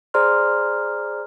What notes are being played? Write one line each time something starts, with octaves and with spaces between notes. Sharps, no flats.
G#4 C5 D5 A#5 C6 F6